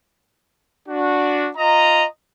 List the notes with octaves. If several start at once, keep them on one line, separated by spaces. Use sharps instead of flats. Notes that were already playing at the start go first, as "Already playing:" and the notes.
D4 F#4
F4 D#5 A#5